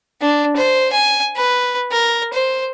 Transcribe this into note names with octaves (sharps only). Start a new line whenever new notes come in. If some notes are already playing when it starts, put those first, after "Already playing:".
D4
C5
G#5
B4
A#4
C5